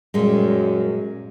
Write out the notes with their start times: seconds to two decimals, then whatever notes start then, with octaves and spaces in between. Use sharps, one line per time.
0.14 F#2 A#2 G3 G#3